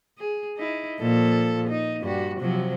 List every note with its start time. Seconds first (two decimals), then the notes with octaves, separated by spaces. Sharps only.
0.19 G#4
0.57 D#4 E4
1.00 A#2 F3 A4
1.69 D#4
2.01 G2 G3 F#4
2.39 C3 F3 F#3